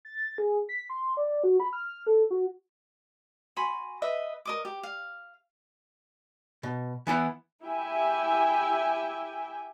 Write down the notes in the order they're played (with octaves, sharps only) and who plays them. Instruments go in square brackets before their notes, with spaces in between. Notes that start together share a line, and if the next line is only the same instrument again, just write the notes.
[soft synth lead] A6
G#4
B6
C6
D5
F#4
B5
F6
A4
F#4
[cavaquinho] F#4 G#5 B5 C6
B4 D#5 E5
A#4 D#5 D6
G4
F5
[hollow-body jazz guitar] B2
E3 B3 E4 B5
[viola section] E4 G4 E5 G5 G#5